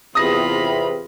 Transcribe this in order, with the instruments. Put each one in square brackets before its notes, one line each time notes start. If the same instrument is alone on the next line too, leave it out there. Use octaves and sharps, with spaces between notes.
[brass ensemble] E2 C3 [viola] F4 B5 [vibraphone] G#4 B4 [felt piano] D#6 A#6